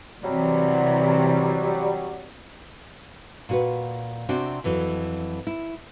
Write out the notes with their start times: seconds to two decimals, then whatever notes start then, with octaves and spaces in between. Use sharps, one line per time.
0.24 C3 E3 F#3 G3
3.49 A#2 F#4 B4
4.29 C3 C4 D4 F#4 G#5
4.64 F2 E3 F#3
5.47 E4